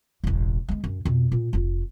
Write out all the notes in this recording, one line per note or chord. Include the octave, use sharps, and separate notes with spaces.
E1 A1
G#3 B3
F#2
F2 B2
A#2
F1 F4